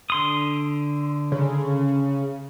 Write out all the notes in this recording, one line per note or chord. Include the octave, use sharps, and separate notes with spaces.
D3 C6 D#6
C#3